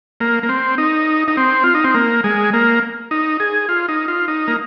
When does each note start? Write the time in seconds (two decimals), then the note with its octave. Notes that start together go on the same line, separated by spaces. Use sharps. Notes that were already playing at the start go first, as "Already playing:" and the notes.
0.20 A#3
0.43 A#3
0.49 C4
0.78 D#4
1.28 D#4
1.37 C4
1.64 F4
1.75 D#4
1.84 C4
1.94 A#3
2.24 G#3
2.53 A#3
3.11 D#4
3.40 G#4
3.69 F4
3.88 D#4
4.08 F4
4.28 D#4
4.48 A#3